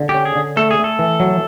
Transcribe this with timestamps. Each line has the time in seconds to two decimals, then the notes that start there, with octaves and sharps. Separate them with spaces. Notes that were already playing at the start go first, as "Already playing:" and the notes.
Already playing: D3
0.09 G4
0.14 C#4
0.25 G#4
0.36 D3
0.56 A3 A4
0.71 G#4
0.78 A3
0.84 A4
0.99 E3
1.20 F#3